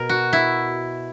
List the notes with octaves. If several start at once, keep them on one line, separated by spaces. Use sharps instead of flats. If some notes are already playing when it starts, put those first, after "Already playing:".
Already playing: B2 A#4
F#4
E4